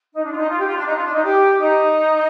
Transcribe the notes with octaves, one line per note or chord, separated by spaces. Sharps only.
D#4
D4
F4
D#4
F4
G4
F4
D4
D#4
F4
D4
D#4
G4
D#4